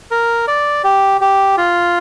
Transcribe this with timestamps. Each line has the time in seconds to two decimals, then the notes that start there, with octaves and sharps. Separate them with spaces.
0.11 A#4
0.48 D5
0.84 G4
1.21 G4
1.58 F4